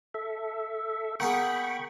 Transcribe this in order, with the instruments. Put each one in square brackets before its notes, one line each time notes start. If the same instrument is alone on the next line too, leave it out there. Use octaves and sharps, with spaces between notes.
[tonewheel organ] A4 E5
[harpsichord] A#3 B3 G#4 [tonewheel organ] G5 B5 C#6